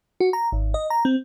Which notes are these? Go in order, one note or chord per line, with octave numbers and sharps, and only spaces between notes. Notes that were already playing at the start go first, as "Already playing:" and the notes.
F#4
A#5
G#1
D#5
A#5
C4